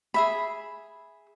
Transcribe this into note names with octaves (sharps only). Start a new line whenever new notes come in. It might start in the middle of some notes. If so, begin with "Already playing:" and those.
G#4 E5 B5